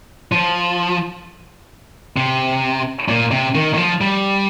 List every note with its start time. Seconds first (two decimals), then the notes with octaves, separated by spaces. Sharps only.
0.32 F3
2.17 C3
3.08 A#2
3.31 C3
3.55 D#3
3.74 D#3
3.77 F3
4.01 G3